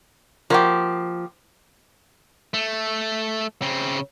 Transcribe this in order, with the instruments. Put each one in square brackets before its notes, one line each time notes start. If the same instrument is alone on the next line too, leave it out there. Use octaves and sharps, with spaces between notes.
[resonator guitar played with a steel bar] F3 [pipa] A#3 F#4 G4
[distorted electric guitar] A3
C#3 C4